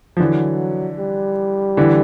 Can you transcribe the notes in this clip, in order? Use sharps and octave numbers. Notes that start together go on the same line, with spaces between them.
F3
D3 E3 F#3
G3
D3 E3